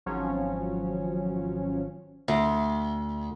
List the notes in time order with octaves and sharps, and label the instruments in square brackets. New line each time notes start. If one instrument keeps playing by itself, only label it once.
[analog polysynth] G#1 F3 F#3 C#4
[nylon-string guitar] D2